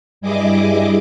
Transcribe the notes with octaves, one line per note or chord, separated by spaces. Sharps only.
G2 G3 E4 G#4 D#5 D6